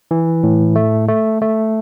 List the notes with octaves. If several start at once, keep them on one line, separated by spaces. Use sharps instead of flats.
E3
A2
A3
A3
A3